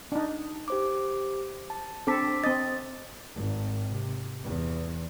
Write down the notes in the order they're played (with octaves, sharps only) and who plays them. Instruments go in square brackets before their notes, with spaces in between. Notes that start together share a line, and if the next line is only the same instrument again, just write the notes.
[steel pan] D4 D#4
[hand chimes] G4 C5 D6
A5
[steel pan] C4 A4 [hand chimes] D4 D6 B6
[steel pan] C4 D#5 [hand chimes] A6
[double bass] G#1
C3
E2